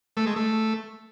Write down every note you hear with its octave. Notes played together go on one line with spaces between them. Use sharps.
A3
G#3
A3